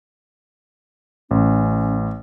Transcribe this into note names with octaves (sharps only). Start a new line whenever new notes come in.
A1 C#4